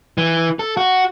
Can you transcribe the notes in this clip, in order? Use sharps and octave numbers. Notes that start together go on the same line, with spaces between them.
E3
A4
F#4